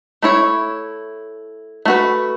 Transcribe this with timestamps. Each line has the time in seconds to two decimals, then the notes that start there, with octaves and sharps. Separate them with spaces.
0.22 A3 E4 C#5
1.85 A3 F#4 B4